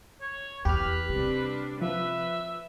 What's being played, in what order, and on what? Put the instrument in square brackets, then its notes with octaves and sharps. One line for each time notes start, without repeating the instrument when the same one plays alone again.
[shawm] C#5
[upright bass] E2 [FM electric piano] G4 F6 [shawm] B4
[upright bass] C3 [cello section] G3 C4 D4
[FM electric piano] F3 [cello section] B4 [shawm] E5